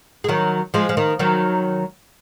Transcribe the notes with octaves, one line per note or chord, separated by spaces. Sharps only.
G#3
D#3 F#3
F3 G#3
F3
D#3
D#3 F#3